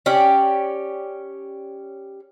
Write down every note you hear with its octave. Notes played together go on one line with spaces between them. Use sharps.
C#4 G4 D5